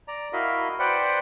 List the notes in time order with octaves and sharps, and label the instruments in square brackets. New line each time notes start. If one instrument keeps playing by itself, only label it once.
[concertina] D5 A#5
E4 F#4 A#4 D#5 F5 B5
B4 C5 D5 F#5 G5 B5